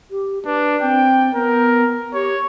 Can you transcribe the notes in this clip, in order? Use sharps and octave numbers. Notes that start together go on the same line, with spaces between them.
G4
D4 B4
C4 G5
B3 A#4
G4 C#5